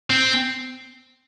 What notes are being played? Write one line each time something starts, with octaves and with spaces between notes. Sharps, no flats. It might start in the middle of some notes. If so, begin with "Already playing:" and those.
C4